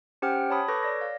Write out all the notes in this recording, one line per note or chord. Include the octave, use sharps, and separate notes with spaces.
C#4 G4 C5 F#5 G5 F6
C#5 A5 B5 D#6
A4 B4 C#6 D6 G6 A#6
C#5 D5 A#6
F5